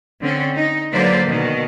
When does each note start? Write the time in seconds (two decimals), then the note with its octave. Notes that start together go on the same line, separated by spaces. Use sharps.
0.21 D3 C4 C#4
0.56 D#4
0.93 D3 F#3 A#3 B4 C5 D5
1.25 B2 D#3